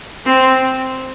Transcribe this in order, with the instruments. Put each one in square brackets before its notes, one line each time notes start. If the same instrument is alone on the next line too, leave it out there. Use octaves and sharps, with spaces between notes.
[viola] C4